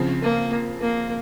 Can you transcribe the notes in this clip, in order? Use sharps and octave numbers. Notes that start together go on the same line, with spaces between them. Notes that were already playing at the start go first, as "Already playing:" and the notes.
Already playing: C#3 F3 C4
A#3
A#3